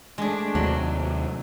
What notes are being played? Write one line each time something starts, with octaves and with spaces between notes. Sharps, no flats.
G#3 A3 D4 G#4
D#2 C3 F#3